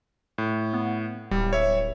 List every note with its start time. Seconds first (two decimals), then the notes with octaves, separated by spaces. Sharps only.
0.38 A2
0.73 B3
1.31 D1 G3
1.53 C#5 E5